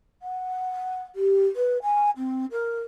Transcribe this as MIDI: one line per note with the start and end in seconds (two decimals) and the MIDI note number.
0.22 1.03 78
1.15 1.45 67
1.55 1.78 71
1.82 2.10 80
2.17 2.45 60
2.51 2.80 70